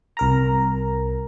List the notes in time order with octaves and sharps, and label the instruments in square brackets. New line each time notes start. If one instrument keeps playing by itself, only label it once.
[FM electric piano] C2 A#4 A#5